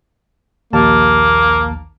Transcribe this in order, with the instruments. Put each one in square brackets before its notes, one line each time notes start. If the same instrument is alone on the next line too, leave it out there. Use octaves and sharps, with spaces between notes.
[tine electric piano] A#1 D#2 A5 [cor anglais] A#3